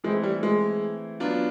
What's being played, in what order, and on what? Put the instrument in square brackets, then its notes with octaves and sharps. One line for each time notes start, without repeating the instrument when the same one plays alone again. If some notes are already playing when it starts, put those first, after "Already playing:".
[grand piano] E3 A3 C4 E4 [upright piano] G#3
[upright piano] G3
G#3
[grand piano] F#3 B3 D4 F4